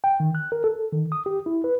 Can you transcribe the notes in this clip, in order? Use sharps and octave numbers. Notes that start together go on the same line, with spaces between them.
G5
D#3
F#6
A#4
A4
D#3
D#6
G4
E4
B4